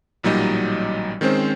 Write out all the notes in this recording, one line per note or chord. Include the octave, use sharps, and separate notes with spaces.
A1 A#2 F#3 G3 D#4 D#5
D#3 G#3 C4 C#4 C5